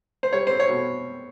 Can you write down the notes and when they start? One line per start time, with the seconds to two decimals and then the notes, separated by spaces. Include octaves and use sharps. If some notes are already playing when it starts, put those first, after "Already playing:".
0.23 C5
0.33 G3 C#5
0.47 C4 C5
0.60 C#5
0.69 B2